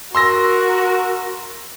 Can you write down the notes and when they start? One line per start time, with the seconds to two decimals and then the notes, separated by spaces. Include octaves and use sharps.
0.15 F#4 A#4 C6 E6 A#6